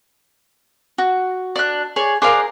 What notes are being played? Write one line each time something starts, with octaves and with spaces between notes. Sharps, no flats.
F#4
D4 F#6
G#4 C#5 D5
D4 G#4 A#4 C5 F5